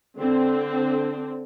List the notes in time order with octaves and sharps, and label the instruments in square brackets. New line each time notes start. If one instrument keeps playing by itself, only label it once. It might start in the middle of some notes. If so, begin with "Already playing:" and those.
[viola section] D3 C4